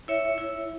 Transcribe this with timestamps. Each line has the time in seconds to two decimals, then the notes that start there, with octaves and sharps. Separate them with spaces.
0.08 E4 C#5 E5
0.38 E4